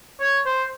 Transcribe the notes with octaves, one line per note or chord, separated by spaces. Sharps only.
C#5
C5